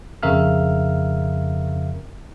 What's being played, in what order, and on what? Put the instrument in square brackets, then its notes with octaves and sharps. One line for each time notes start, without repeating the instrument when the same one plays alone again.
[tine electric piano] F2 C#3 A#4 E5 F5 F6